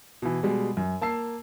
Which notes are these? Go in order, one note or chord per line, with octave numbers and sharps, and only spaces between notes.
B2 E3
B2 G3 G#3
F#2
A#3 A5 E6 C7